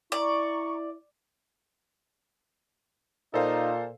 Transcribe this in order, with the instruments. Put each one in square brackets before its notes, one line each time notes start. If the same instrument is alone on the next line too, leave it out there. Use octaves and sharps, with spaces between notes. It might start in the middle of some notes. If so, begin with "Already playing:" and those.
[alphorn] E4 [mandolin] D5 [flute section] A#5 C#6
[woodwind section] A#2 [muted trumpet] D#4 [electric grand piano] A4 C5 F5